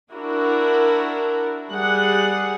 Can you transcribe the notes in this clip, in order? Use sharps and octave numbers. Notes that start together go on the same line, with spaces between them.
D4 E4 F#4 A#4
G3 G#4 F#5